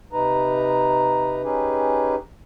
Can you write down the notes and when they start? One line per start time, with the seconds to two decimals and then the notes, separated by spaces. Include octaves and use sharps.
0.13 C3 D#4 B4 A#5
1.44 C#4 D#4 G4 G#4 B4